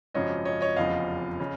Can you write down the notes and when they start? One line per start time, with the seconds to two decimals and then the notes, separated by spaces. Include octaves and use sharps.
0.14 G#1 F#2 C#3 F3 C#5 D#5
0.45 C#5 D#5
0.61 C#5 D#5
0.76 F1 E2 C#3 F3 D#5 F5
1.40 C#3